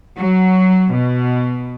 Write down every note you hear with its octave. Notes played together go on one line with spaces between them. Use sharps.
F#3
B2